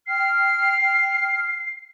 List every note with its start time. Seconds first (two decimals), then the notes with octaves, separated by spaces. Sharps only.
0.07 G5 F6 C7